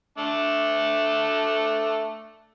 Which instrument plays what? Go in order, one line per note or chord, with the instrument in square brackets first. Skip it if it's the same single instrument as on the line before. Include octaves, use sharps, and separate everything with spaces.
[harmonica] A3 D4 A4